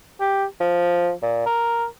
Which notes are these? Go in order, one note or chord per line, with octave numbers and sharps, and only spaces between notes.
G4
F3
A#2
A#4